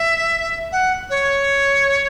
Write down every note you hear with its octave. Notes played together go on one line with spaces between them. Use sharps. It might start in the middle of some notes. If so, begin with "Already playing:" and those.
Already playing: E5
F#5
C#5